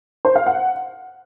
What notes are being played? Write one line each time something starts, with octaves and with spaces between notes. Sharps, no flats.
C5
F5
F#5